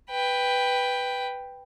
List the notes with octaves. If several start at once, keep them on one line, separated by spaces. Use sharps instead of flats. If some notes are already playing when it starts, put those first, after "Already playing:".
B4 G5